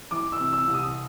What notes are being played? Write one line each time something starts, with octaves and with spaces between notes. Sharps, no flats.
E3 D6
E6
C3
E6
C2
D#6